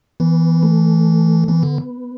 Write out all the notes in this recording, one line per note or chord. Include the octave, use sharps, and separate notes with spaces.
E3 B3
A3
E3 B3
D3